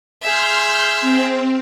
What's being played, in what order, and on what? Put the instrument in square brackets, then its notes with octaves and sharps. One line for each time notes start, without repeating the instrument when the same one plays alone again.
[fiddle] G#4 E5 [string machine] C6 F6 G6
[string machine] C4